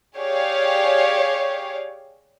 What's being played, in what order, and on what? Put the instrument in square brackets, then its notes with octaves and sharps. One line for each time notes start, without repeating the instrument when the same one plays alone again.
[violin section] G4 G#4 C#5 D5 F5